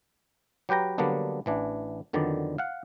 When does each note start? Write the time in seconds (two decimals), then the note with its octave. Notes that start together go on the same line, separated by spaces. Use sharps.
0.69 F#3 G4 B4 G5 A#5
0.98 D3 F#3 G3 A#3 B3 D4
1.46 A1 E3 D4
2.13 F2 D3 D#3 F#3 B3 D5
2.58 F5 F#5